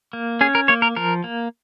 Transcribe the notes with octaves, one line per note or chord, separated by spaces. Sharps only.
A#3
C#4 G#4
A#4
A#3 C#5
A#4
F3 A#4
A#3